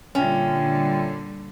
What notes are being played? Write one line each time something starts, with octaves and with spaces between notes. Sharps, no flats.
A#2 D3 G3 C#4 F4 E5 G5